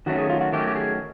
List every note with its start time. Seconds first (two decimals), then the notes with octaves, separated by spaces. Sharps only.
0.06 D#3 F#3 A3 C#4 F#4
0.18 G#4
0.30 F4
0.41 F#4
0.53 D#3 F#3 A3 C#4 G4
0.68 G4
0.75 G#4